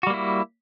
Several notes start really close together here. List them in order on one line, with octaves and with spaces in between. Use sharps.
F#4 G3 A#3 E4